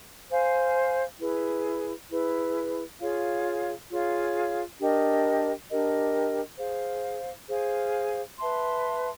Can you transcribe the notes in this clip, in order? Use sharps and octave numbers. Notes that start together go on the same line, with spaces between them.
C5 F5 G#5
E4 G#4 B4
E4 G#4 B4
F4 G#4 C#5 F5
F4 G#4 C#5 F5
D4 G4 A#4 D#5
D4 G4 A#4 D#5
G#4 C5 F5
G#4 C5 F5
B4 E5 A5 C6